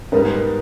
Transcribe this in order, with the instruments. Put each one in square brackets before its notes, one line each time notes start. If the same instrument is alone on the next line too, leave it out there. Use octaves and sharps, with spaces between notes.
[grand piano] G#2 G3 B3 [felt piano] A#4